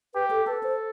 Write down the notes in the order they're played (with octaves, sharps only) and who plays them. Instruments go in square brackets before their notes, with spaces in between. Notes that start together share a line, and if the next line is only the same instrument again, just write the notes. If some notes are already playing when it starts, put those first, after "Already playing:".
[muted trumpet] G4 [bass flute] B4
[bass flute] A4
[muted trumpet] A4 [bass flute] B4
[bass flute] C5